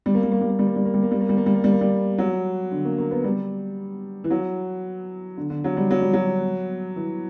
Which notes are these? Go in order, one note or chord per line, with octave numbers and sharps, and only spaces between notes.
G3
A#3
G3
A#3
G3
A#3
G3
A#3
G3
A#3
G3
A#3
G3
A#3
G3
A#3
G3
A#3
G3
A#3
G3
F#3
D3
A#3
A#3
B3
G3
E3
F#3
D3
D3
F#3
G3
F#3
G3
F#3
E3